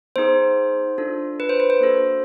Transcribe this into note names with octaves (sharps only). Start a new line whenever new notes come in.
B3 D#4 G#4 C5
D4 F4 A4
B4
C5
B4
C5
A#3 D4 F#4 A4